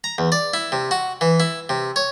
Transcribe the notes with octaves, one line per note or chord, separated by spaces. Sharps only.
A#5
E2
D5
E4
C3
F#4
E3
E4
C3
C#5